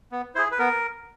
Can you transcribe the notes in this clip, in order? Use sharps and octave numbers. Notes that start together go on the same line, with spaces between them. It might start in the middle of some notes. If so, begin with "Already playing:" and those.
B3
E4 G#4 C5
B4
B3 A#4